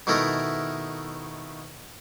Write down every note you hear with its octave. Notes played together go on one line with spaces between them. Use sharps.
B2 D#3 A3 E4 A4 A#4